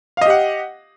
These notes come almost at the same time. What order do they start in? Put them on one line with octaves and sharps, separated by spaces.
F5 D#5 G4 F#5